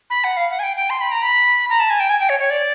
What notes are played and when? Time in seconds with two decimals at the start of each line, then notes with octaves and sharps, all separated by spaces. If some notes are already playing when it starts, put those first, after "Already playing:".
0.10 B5
0.24 F#5
0.37 F5
0.50 F#5
0.59 G#5
0.63 G5
0.76 G5
0.90 C6
1.01 B5
1.12 A#5
1.22 B5
1.70 A#5
1.80 A5
1.90 G#5
2.00 G5
2.10 G#5
2.20 G5
2.29 C#5
2.40 C#5
2.50 D5